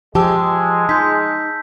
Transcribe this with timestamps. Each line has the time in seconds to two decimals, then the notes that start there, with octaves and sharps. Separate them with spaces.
0.15 F3 G#3 G4 A5 E6
0.89 D#4 G6 B6